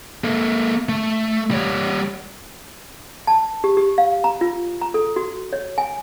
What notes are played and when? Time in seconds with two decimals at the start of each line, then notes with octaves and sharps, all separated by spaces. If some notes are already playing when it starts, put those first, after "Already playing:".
0.24 A#3 A4
0.89 A3
1.51 G3 C#5
3.27 A5
3.64 G4
3.77 G4
3.98 F5
4.24 A#5
4.41 F4
4.81 A#5
4.94 A4
5.16 F#4
5.53 C#5
5.78 G#5